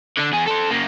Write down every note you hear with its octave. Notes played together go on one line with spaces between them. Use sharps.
D3 D4
E2 G#4
A4 C5
F#2 A#3